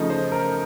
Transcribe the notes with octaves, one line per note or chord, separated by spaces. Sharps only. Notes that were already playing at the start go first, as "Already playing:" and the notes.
Already playing: C#3 F3 A3 D#4 D#5
C5
A#4